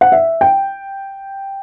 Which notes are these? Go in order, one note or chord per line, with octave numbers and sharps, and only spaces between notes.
F#5
E5
G5